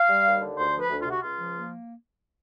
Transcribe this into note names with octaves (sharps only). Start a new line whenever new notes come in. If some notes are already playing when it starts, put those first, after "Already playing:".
Already playing: F5
G3
D#2
D3
D2 C5
F3
B4
D2
F4
C3 F#4
C#2 F4
F3
A#3